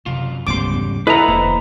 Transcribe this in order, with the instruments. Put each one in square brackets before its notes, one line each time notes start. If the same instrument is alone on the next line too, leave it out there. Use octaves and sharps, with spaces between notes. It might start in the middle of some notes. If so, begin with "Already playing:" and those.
[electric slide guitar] F#2 F4 [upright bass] C3
[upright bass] D2 B3 [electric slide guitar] G#2 C#3 G3 [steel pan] C6 D6
[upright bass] E2
[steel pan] E4 A4 D#5 [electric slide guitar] F4 F5 F#5 [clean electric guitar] B4 A#5
[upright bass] E1 [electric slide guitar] D3 A#3 C5